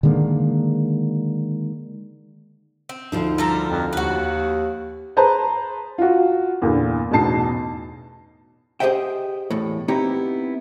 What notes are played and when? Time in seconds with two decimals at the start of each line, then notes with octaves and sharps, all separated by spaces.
0.03 D3 D#3 G#3 A#3
2.89 C4
3.12 D2 F3 D#4
3.38 G3 A4 A#4
3.69 F2
3.93 D#2 F#4 B4
5.16 G#4 B4 C5 A5 A#5
5.98 F4 F#4
6.62 E2 A#2 D3
7.11 A1 E2 B2 D#4 A5 C7
8.80 G4 G#4 C5 D#5 E5 G5
9.50 E2 A2
9.88 B3 C4 D#4 E4 G4 C#5